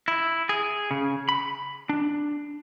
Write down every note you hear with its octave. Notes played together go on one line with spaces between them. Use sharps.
E4
G#4
C#3
B5
D4